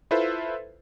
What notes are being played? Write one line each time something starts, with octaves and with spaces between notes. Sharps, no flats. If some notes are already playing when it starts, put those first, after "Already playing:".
E4 F4 A4 B4 C5 E5